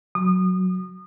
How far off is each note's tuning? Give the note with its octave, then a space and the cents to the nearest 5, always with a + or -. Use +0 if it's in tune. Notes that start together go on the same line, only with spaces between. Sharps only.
F#3 +0 D#6 -30